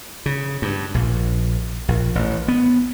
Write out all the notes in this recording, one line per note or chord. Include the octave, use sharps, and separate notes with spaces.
C#3
G2
A#1
A#1
A1
B3